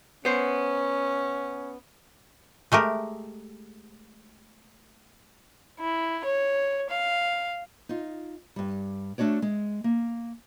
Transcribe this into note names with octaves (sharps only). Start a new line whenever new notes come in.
B3 C#4 C5
G#3 A3 G4 A#4
E4
C#5
F5
D#4 F4
G2 G3
A3 D4 F#4 C#5 D5
G#3
A#3